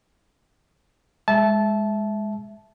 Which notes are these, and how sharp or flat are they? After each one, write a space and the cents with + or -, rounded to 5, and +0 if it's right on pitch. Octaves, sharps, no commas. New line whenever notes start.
G#3 +0 E5 +0 A5 -20